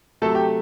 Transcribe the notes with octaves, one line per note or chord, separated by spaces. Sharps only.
C3 F#3 A3 A4
G4